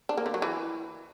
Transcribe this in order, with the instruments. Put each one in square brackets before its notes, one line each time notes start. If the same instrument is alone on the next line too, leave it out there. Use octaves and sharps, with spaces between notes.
[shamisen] D4
A#3
D3
F#3
E3